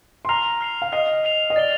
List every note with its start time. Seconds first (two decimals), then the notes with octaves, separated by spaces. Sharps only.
0.25 C6
0.29 A#5 F6 C7 F7
0.61 F6 C7 F7
0.82 F5
0.92 D#5 F6 C7 F7
1.24 F6 C7 F7
1.50 D#5
1.56 D5 A6 C7 G7